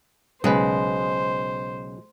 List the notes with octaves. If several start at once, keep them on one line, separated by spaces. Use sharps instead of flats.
B1 C#3 G#3 B4 C5